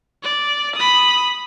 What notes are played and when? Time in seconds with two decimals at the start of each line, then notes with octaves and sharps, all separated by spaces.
0.23 D5
0.76 B5 D#6